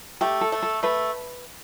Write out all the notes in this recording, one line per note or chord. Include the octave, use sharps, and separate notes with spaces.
A3 G4
A4
A3
A4
A3 B4